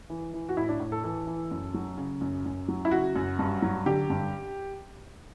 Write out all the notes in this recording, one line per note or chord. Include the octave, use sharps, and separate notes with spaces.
E3
E3
F#4
A2 E4
D4
A2
A4
E3 A4
E3
F#2
F#3
C#3
F#2
F#2
F#3
E4
C#3 F#4
F#2
G2
F#3
D3 G4
G2